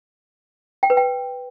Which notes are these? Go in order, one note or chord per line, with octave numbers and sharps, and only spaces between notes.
G5
B4
G5